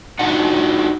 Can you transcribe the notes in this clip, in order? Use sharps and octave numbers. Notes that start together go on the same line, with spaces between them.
D4 D#4 F#4 F#5